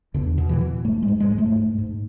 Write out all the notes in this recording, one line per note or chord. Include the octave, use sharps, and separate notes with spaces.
E2 D3
B2
E3
B2
G#2 A3
G#3
G#2
G#3
G#2
A3
G#2
G#2